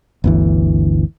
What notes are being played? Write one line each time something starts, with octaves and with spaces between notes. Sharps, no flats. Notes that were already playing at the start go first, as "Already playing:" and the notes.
G1 D2 E3